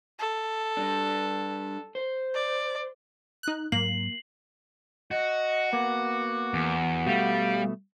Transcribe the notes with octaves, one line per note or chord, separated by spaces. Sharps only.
A4
G3 D4
C5
D5
D#4 F#6
G#2 F#3 A#3 C7 F#7
F#4 D#5
A#3 B3 D6
E2
B2 G3 A3 F5